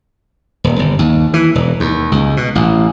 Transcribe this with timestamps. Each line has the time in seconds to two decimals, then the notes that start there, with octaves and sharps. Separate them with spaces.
0.64 D#1
0.79 G1
0.99 D#2
1.34 E3
1.55 E1
1.80 D#2
2.12 C#2
2.37 B2
2.55 A1